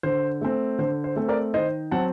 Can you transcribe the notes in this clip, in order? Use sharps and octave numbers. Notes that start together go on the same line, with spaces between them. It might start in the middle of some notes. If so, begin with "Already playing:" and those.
D3 C5
A3 C4
D3 C5
C5
A3 C4
A#4 D5
D#3 C5 D#5
F#3 C4 F#5 A5